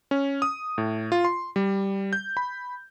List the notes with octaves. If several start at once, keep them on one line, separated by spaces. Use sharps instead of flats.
C#4
D#6
A2
F4
C6
G3
G6
B5